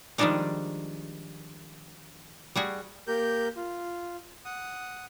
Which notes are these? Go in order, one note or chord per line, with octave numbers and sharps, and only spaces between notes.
D#3 F3 G3 G#3 D4 D#4
G3 F#4 G#4
A#3 G4 A#4 G6
F4
F#5 D#6